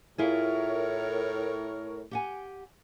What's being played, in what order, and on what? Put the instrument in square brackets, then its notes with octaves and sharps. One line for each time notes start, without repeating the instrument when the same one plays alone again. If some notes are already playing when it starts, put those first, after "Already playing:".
[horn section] A2 A#4 C#5 [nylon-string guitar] E4 F4 G#4
[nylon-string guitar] G4 F#5 G#5